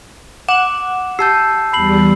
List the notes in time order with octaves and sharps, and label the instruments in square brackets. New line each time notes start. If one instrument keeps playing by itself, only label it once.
[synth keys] F#5 [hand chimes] D6 [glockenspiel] E7
[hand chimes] G4 A5 G6 [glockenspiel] E6 C7
[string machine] E2 G3 [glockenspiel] B5 C7 F#7